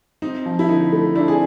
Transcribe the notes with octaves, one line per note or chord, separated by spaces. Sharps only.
C4 D#4
F3
E4
D3 D#4
A3
C4 D4 E4
G#4